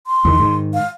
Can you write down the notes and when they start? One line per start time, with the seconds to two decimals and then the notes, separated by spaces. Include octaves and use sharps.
0.07 C6
0.25 E2 D3 D#3
0.39 G#2 D#3
0.74 F5